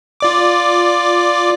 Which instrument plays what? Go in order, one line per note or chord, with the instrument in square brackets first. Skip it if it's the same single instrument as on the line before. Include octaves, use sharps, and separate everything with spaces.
[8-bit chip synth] F4 D5 D6